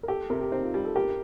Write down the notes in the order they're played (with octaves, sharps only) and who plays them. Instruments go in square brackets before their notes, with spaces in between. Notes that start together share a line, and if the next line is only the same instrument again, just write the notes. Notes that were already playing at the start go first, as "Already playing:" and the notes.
[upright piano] A#4
[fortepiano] G4 [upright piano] A4
[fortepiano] C3 [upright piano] A#4
[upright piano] G4
[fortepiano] C4 [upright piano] D#4
[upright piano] F4
[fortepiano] G3 [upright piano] G4
[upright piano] A4
[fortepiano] G4 [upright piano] A#4